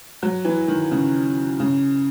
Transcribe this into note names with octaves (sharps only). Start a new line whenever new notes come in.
F#3
E3
D#3
C#3
C#3